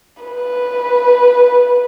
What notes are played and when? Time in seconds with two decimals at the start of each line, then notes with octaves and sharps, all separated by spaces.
0.23 B4